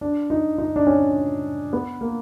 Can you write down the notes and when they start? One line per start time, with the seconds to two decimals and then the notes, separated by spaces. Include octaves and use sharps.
0.01 D4
0.30 D#4
0.58 D#4
0.76 D4
0.87 C#4
1.73 B3
2.01 A#3